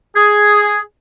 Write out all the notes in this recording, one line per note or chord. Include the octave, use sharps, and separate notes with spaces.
G#4